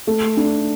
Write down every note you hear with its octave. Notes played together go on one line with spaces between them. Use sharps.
A3
D4